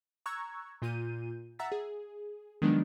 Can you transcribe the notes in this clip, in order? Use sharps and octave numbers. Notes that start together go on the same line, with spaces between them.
A#5 C#6 E6 F#6 G#6
A#2 F4 G6 D#7
E5 F#5 A#5 E6 A6 B6
G#4
D#3 F3 F#3 G#3 B3 D4